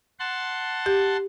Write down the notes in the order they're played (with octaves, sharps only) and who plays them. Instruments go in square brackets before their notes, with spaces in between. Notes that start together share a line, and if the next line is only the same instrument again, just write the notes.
[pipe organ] F#5 A5 C6
[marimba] G4